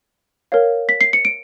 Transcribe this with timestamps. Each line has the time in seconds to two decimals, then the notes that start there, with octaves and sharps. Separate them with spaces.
0.52 A#4 C#5 F5
0.89 B6
1.01 C7
1.13 C#7
1.25 D7